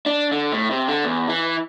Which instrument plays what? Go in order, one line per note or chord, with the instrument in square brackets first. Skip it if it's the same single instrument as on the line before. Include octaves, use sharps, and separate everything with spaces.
[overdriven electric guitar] D4
D3
A2
C3
D3
E2
E3